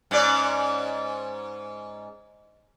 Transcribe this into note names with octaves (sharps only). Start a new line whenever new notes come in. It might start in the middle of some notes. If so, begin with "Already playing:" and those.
G#2 C#4 D5